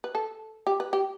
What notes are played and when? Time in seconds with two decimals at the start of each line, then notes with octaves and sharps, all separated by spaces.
0.04 B4
0.15 A4
0.67 G4
0.80 B4
0.93 G4